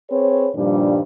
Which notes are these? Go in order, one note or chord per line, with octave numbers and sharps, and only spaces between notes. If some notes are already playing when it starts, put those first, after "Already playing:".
C4 G#4 B4 C#5
G2 A#2 D#3 F3 G3 D4